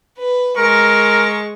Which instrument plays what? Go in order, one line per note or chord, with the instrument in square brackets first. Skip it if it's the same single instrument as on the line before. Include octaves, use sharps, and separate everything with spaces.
[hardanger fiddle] B4
[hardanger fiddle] G#3 C#6 [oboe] A#4